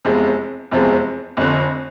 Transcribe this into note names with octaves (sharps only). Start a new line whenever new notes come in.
F1 E2 C3 F3 G#3
F1 E2 C3 F3 G#3
F1 F2 D3